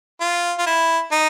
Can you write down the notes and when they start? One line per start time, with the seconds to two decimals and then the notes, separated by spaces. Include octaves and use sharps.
0.20 F4
0.58 F4
0.66 E4
1.12 D#4